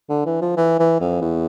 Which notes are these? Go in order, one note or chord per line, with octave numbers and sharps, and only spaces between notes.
D3
E3
F3
E3
E3
F2
E2